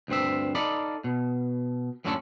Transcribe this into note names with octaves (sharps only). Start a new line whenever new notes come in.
D2 G2 C4 E5
D#4 A4 D5 F5 B5
B2
F#2 A2 D3 G3 A3 C#4